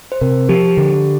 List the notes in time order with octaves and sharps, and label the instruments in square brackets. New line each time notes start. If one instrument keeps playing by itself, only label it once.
[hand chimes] C5
[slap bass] C3 [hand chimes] A#4
[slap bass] F3 [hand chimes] G4
[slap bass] D3